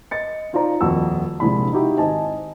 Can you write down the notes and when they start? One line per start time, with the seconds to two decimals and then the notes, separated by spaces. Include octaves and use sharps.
0.11 D#5 A6 C#7
0.53 D#4 F4 C5 D5 A#5
0.81 D#1 F2 F#4 E6
1.40 A#1 C3 G#3 D4 B5
1.73 D#4 E4 F#4 G4 E5
1.98 G#1 C4 D#5 G#5 A5